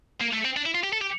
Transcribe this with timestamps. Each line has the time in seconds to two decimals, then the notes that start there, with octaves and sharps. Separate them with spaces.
0.20 A#3
0.33 A3
0.45 C4
0.57 D4
0.66 E4
0.75 F4
0.84 G4
0.93 A4
1.01 G4